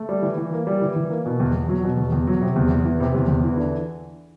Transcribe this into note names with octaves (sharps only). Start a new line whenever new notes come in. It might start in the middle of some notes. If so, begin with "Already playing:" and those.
Already playing: A3
G3
E3
E3
A#3
G3
E3
E3
A#3
B2
E2
E2
F#3
B2
E2
E2
F#3
C3
E2
E2
E3
C3
E2
E2
E3
D3